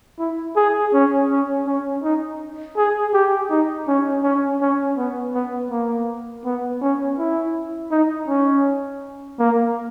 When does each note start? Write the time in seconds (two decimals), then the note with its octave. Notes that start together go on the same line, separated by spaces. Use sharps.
0.19 E4
0.56 G#4
0.93 C#4
1.29 C#4
1.66 C#4
2.03 D#4
2.77 G#4
3.13 G4
3.50 D#4
3.88 C#4
4.23 C#4
4.61 C#4
4.97 B3
5.34 B3
5.71 A#3
6.45 B3
6.82 C#4
7.18 E4
7.91 D#4
8.28 C#4
9.39 A#3